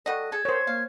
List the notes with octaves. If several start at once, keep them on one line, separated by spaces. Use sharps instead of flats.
G3 F#4 A4 D#5
G#4 A4 G#6
A#4 C5 C#5
A#3 F5